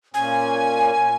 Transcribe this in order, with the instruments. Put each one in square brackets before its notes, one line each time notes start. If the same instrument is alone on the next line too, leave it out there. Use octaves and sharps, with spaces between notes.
[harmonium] A#2 C#4 [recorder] G#5